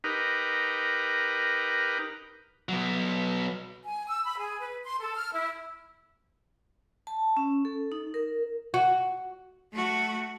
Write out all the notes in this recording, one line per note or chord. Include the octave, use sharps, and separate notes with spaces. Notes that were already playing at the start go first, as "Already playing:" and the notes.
D#4 G4 A#4 B4
F#3 B3
G#5
E6
B5
G#4
B4
C6
A4
F6
E4
A5
C#4
A4
D#4
A#4
F#4
A3 F#4